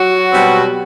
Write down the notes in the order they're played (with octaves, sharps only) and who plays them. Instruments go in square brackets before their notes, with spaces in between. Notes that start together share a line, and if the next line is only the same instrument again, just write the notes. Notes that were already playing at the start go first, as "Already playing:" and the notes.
Already playing: [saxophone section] F#3 F#4
B2 G3 C4